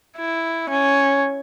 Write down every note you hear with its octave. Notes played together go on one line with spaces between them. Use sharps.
E4
C#4